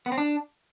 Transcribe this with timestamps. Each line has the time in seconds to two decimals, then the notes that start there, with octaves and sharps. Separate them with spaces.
0.06 B3
0.12 C4
0.18 D4